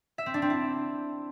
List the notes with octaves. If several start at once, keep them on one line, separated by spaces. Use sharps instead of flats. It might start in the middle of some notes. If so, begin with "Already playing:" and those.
E5
C4
D4
C4
E4